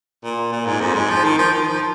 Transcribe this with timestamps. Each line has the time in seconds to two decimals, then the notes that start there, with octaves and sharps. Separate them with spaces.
0.24 A#2
0.52 A#2
0.66 G#2
0.80 F2
0.95 G#2
1.10 F3
1.24 D#3
1.38 F3
1.52 D#3
1.67 F3